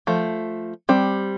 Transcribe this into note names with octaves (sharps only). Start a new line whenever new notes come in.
F3 A3
G3 C4